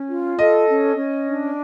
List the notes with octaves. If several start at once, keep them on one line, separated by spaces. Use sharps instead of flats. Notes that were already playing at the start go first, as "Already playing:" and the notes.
Already playing: C#4
F4
A4 D#5
C#4
C#4
D4